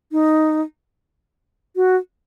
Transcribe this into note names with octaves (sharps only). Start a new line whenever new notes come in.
D#4
F#4